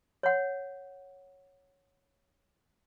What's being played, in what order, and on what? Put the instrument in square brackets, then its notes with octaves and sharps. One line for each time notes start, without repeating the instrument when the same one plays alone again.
[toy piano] C#5 F#5